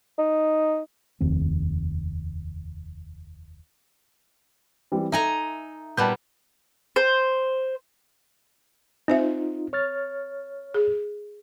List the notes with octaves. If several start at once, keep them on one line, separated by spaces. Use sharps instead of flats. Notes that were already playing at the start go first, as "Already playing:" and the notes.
D#4
F1 D#2 C4
E3 G3 C4
D#4 A4 E5 G#5 A#5
A#2 G3 B3 A5 F#6 G6
C5
C4 D#4 F4 C5 E5
C#5 F6 A6
G#4